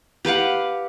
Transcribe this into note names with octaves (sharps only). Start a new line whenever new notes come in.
G4 B4 F5 F#5